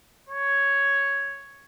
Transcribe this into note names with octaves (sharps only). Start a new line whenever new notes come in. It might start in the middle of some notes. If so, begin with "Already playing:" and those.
C#5